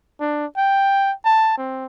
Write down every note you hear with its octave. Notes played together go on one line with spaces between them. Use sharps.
D4
G5
A5
C4